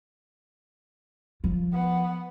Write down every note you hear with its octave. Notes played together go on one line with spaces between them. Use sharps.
F3
B3 F#5